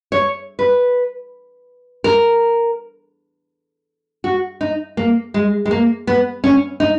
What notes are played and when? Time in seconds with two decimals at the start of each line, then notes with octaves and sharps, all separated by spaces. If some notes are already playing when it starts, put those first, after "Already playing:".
0.12 C#5
0.59 B4
2.04 A#4
4.24 F#4
4.61 D#4
4.97 A#3
5.34 G#3
5.66 G#3
5.71 A#3
6.07 B3
6.44 C#4
6.80 D#4